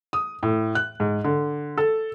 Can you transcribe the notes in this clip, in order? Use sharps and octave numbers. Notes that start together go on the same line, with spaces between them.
D#6
A2
F#6
G#2
D3
A4